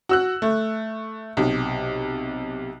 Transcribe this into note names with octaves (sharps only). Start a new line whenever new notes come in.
F#4 E6 F#6
A3
B1 C3